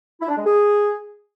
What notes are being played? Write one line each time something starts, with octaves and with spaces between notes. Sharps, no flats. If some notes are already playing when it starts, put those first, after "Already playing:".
E4
D4
G#3
G#4